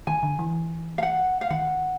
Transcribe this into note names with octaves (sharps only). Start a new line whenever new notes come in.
D#3 G#5
D3
E3
F5
F#5
F5
D#3 F#5